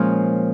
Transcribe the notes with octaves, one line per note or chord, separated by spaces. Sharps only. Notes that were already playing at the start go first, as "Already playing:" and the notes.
Already playing: A#2 F3 G#3 C#4